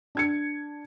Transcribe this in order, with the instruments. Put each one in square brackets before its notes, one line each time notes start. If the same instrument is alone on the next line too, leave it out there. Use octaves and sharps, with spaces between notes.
[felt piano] D4 G#6 C#7